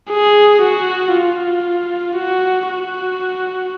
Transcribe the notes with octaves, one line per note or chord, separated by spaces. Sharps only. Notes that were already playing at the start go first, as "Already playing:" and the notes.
G#4
F#4
F4
F#4
F#4